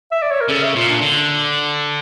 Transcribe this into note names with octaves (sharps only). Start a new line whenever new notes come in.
E5
D5
C#5
A#4
C#3 A4
E5
A#2 F4
D4
D3